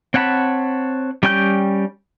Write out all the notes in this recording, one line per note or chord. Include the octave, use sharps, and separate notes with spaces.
C4 C#5 F#5 A5 B5
G3 C#4 G5 G#5 G6